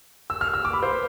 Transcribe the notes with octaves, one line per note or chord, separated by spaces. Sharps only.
E6
F6
E6
D6
B5
C5
B4